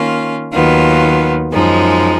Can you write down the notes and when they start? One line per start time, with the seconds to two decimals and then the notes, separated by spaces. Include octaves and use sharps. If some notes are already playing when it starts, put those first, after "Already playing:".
Already playing: D#3 A#3 C#4 F4
0.53 D#2 D#3 F#3 B3 F4
1.51 F#2 F3 G#3 D#4